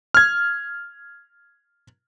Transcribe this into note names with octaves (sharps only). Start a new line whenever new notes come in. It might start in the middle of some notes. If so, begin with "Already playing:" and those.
F6 G#6